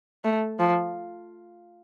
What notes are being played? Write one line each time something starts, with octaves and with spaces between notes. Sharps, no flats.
A3
F3